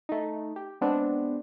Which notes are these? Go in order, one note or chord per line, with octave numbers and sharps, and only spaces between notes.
A3 D#4
G4
G#3 B3 C4 D4